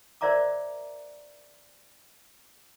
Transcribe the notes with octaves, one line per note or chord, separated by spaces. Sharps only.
A#4 C5 D5 E5 A#5 D6